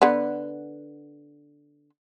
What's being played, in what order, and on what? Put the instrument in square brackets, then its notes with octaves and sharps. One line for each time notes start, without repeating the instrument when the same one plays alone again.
[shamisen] D3 B3